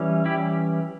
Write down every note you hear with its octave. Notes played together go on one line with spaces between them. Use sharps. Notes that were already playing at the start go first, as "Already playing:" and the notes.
Already playing: E3 G3 C#4
E4 G4